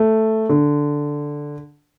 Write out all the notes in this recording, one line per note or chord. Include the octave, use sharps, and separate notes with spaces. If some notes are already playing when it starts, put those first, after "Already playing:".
Already playing: A3
D3